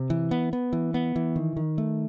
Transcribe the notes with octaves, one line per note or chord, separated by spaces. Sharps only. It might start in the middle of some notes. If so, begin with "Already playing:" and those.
Already playing: C3
E3
B3
B3
E3
B3
E3
D#3
D#3
A3